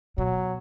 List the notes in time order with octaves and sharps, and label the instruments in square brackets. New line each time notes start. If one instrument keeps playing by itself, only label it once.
[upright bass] B2 [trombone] F#3